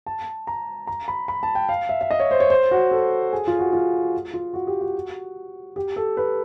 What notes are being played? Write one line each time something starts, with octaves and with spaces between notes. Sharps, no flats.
A5
A#5
A#5
B5
B5
A5
G5
F5
E5
E5
D#5
C#5
C5
C#5
C5
F#4
A4
G#4
F4
F#4
F4
F4
F#4
G4
F#4
G4
A4
B4